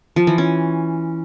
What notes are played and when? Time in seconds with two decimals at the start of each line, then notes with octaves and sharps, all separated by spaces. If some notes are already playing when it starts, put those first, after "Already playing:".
0.16 F3
0.27 E3
0.38 C#4